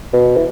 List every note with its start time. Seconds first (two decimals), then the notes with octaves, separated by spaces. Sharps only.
0.13 B2
0.36 E3